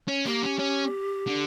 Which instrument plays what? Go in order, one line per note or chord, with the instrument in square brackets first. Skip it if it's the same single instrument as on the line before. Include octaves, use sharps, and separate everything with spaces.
[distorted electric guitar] C#4
[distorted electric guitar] A#3 [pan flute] G4
[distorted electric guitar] C#4
C#4
D3